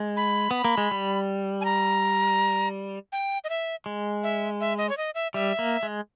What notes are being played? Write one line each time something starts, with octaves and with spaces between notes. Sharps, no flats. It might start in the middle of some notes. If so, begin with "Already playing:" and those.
Already playing: G#3
B5
B3
A#3
G#3
G3
G#5
A#5
G5
D#5
E5
G#3
E5
E5
D#5
C#5
D#5
E5
G3 E5
A#3
G#3